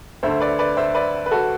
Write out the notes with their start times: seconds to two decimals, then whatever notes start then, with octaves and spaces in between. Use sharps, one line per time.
0.23 D2 D3 A3 C5 E5
0.40 B4 D5
0.59 B4 D5
0.77 C5 E5
0.95 B4 D5
1.26 B4
1.31 F#4 A4